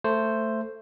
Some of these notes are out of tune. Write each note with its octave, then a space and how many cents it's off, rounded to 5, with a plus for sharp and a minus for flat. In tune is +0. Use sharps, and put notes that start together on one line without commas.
A3 +15 C5 +0